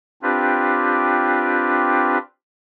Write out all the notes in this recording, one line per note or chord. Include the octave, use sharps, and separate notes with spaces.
C4 D4 F4 G4 B4